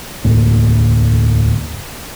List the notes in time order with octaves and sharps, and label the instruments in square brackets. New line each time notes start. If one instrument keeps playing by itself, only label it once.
[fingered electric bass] E1 D2 A2 A#3